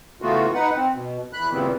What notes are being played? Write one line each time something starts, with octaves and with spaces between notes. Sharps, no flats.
C#3 E3 A3 B3 F4 F#4
D#4 B4 F#5
C4
B2
E2 B5 F#6
A#2 C#3 E3 G3 B3 C4